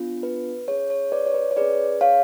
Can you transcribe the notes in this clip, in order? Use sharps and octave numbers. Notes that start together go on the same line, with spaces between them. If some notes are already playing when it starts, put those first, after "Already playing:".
Already playing: B3 D4 F4
B4
C#4 G#4 C#5
C#5
B4 D5
C#5
B4
C#5
C#4 G#4 B4 D5
C#5 F5